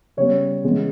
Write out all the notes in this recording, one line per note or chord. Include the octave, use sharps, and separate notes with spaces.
C#3 G3 B3 C#5
C#3 E3 G#3 B3